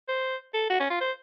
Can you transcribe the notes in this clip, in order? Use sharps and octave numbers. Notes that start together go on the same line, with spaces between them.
C5
A4
F#4
C#4
F4
C5